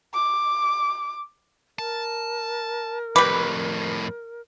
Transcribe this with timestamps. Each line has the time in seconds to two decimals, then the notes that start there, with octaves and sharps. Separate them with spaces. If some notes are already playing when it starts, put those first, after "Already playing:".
0.14 D6
1.79 A#4 A5
3.16 F2 A2 G3 B4 D6